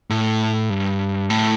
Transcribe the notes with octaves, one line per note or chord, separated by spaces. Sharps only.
A2
G2
A2